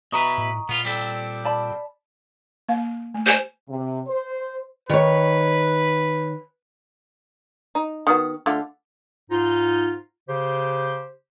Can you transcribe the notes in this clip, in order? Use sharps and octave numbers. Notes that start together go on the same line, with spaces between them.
B2 E4 B4 D#5 A#5 C#6 D#6
A2
A#2 B3 F4
G3 C4 A4 B6
D5 A5 B5
A#3 F5
A3
G4 C5 G#5
C3
C5
D#3 B4 C#5
D#4
D#3 B3 F#4
D3 A3 F4
G#2 D#4 F4
C#3 G4 C5